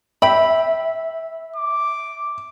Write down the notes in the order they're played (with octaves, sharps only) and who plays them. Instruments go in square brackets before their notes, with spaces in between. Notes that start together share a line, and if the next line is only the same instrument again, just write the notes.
[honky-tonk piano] E5 [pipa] G5 B5
[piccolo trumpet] D6